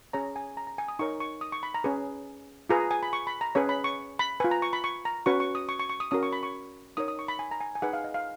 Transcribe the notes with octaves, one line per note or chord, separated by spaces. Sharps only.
C#4 G#4 C#5 A#5
G#5
A#5
A#5
G#5
D#6
D#4 A#4 C#5 C#6
C#6
D#6
C#6
B5
A#5
C#4 G#4 B4
F4 G#4 B4 A#5
A#5
G#5
B5
C#6
B5
A#5
C#4 G#4 B4 C#5
B5
C#6
B5
F4 B4 G#5
A#5
C#6
B5
C#6
A#5
C#4 F#4 B4 C#6
C#6
D#6
C#6
C#6
C#6
D#6
C#4 F#4 A#4 D#6
C#6
B5
C#6
D#4 A#4 C#5 D#6
D#6
C#6
B5
G#5
A#5
G#5
G#5
D#4 G#4 B4 F#5
F5
D#5
F5